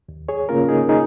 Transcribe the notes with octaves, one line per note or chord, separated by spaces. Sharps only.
D#2
G#4 C#5
C#3 A#3 C#4 F4 A#4
D#4 G#4
D#4 G#4